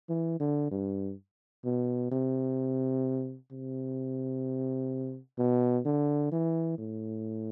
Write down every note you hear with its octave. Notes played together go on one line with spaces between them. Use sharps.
E3
D3
G2
B2
C3
C3
B2
D3
E3
A2